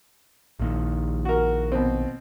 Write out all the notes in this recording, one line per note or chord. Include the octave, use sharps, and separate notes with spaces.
A#1 A#2 D#3
F#4 A#4
B2 C4